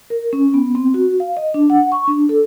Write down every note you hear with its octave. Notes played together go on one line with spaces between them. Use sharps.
A#4
C#4
B3
C4
F#4
F5
D#5
D4
F#5
C#6
D4
A4